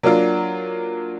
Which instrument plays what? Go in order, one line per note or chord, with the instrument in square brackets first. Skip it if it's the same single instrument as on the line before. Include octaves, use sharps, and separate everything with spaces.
[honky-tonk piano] F#3 A#3 D4 F4